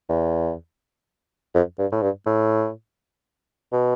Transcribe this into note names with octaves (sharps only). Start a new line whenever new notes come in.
E2
F2
G2
A2
G2
A2
B2